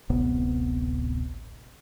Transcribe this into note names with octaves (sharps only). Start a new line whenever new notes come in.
D1 A1 C3 B3